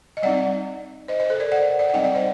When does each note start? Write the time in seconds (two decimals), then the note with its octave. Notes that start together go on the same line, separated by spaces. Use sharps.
0.17 D#5
0.23 G3 C4 D#4 D5 F#5
1.08 C5 D#5
1.20 C5 D#5
1.30 A4 C5
1.40 A#4 D5
1.52 D5 F#5
1.79 D5 F#5
1.90 F#5
1.93 G3 C4 D#4 D#5 G5
2.04 D5 F#5
2.15 C5 D#5